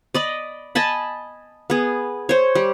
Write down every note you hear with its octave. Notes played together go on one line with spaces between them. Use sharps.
D5 D#5 B5
D#5 G#5 A5 B5
B3 G#4
C5 C#5
G3